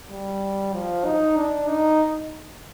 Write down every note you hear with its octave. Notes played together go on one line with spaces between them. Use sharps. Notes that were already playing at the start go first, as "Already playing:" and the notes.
G3
F3
D#4
D4
D#4